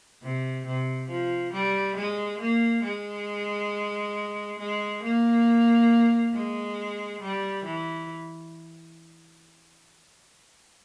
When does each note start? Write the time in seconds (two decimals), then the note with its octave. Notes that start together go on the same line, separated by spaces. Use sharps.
0.22 C3
0.66 C3
1.08 F3
1.52 G3
1.96 G#3
2.40 A#3
2.83 G#3
4.59 G#3
5.03 A#3
6.33 G#3
7.21 G3
7.65 E3